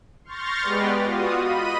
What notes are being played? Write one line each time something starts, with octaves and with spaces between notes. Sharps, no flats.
C6 C#6 F6 G6 A6 A#6
G#3 B3 G4 B4 D5
F4 F#4 D#6
D#5 B5 D#7